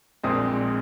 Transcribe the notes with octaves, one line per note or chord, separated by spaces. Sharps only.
A#1 A#2 G#3 C4 D#6